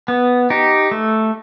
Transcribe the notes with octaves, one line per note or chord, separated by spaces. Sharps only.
B3
D#4 G4
A3